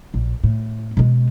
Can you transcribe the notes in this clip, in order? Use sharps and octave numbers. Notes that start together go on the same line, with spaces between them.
A#1
A2
B2 G#3